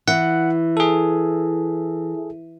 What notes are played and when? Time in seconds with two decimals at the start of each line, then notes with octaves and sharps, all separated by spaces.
0.08 E3 F#5
0.77 G#4 A4